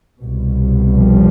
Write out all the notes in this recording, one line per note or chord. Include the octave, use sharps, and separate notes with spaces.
C2 B2
F3 G3